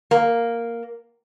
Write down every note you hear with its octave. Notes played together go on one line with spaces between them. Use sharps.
A#3